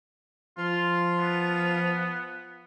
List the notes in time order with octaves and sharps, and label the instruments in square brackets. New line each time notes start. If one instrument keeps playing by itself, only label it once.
[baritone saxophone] F3 [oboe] F4
[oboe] B3